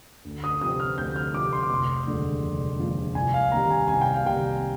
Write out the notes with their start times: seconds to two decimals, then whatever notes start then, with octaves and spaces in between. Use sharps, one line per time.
0.25 D2
0.44 D#6
0.61 C3 F3 C4 D#6
0.80 F6
0.98 D2 G6
1.16 F6
1.34 C3 F3 C4 D6
1.53 C6
1.63 D6
1.70 F1 C6
2.06 D#2 D3 F3 G#3
2.43 F1
2.79 D#2 D3 F3 G#3
3.15 C2 G#5
3.34 F5
3.52 C3 D#3 A#3 A#5
3.70 G#5
3.88 C2 G#5
4.01 G5
4.14 F5
4.25 C3 D#3 A#3 G5